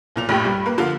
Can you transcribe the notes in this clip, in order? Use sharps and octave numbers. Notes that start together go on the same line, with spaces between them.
B1 A#2 F7
A#1 A2 G4
G2 G3
A#3 B4
D3 F3 F4 A#4